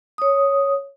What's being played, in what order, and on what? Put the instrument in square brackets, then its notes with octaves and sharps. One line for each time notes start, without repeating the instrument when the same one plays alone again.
[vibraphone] C#5 D#6